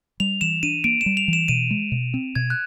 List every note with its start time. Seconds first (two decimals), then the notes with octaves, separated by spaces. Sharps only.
0.20 G3 F7
0.41 E3 E7
0.63 D4 D#7
0.84 A#3 D7
1.01 E7
1.06 G3
1.17 F7
1.28 E3
1.33 E7
1.48 B2 D#7
1.71 G#3
1.92 B2
2.14 C4
2.35 B2 G#6
2.50 F#6